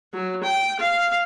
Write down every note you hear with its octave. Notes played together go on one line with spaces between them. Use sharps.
F#3
G5
F5